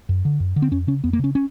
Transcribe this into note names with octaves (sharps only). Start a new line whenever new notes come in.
F#2
D3
F#2
D3
C4
F2 C#4
C#3 C#4
F2 B3
A#3
C#3 C#4
C#4